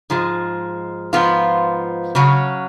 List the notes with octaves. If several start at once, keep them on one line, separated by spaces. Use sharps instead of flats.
G#2 F3 G#3
G#2 F3 B3 F4
C#3 F#3 C#4